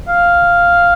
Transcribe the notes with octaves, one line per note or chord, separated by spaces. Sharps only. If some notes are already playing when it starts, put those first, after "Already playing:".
F5